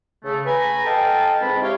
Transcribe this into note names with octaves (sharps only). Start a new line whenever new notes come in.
C#3 A3
B4 G#5 A#5 B5
A4 D#5 F5 G5 A5
C#2 G#2 G#3 C4 F4 B5
E4 G4 C#5 F5